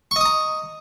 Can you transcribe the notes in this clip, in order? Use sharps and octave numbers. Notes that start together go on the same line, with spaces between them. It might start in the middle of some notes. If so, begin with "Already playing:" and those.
D#5 A#5 C#6 D#6